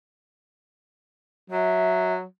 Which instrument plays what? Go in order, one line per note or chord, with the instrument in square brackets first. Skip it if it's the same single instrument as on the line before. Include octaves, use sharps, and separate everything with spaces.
[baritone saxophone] F#3 [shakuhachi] E5